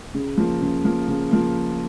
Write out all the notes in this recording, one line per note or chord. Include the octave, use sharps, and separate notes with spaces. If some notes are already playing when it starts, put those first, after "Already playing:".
C#3
F3 A#3
C#3
F3 A#3
C#3
F3 A#3